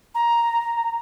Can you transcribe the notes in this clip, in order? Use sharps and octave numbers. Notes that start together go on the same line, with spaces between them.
A#5